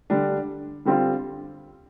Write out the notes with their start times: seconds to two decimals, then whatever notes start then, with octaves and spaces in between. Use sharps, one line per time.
0.10 D3 G3 D4
0.85 D3 G3 C4 F4